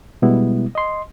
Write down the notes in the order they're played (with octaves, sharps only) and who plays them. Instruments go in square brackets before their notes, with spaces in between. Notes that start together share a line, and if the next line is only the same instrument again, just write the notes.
[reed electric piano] B2 G3 G#3 B3 E4
D#5 C6